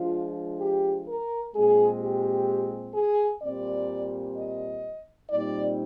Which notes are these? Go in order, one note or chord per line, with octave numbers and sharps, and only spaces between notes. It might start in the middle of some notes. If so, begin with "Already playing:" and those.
Already playing: F3 G#3 D4 F4
G4
A#4
A#2 G#3 C4 G#4
G4
G#4
A#2 G3 C4 D5
D#5
A#2 G3 C4 D#4 D5